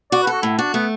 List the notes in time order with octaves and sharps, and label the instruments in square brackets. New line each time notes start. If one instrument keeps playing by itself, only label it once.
[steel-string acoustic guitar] F#4 [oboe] D5
[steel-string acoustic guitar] A4 [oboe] B4
[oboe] F#4
[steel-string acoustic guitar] A2 [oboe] E4
[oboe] D4 [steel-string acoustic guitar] F#4
[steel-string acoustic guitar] A3 [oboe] B3